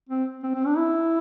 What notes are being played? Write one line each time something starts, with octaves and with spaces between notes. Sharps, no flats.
C4
C4
C4
D4
E4